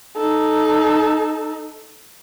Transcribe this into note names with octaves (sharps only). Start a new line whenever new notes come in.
D#4 A4